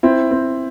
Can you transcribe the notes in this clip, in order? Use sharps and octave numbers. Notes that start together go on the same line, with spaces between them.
C4 E4
C4